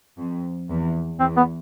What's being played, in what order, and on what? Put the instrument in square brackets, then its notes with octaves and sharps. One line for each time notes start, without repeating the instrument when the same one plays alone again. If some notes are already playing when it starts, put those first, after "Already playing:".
[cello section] F2
E2
[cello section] E2 [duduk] C4
[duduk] B3